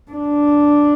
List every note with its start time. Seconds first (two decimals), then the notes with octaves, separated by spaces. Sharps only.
0.11 D4